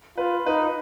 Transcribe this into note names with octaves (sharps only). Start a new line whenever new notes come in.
F4 B4
D#4 B4